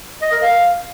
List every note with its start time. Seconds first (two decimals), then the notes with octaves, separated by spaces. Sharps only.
0.22 D#5
0.32 A#4
0.42 F5